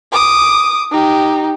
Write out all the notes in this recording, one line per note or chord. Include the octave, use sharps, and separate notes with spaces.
D6 D#6
D#4 G4